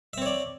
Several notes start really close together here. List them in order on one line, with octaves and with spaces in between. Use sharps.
E5 C4 C#5 D5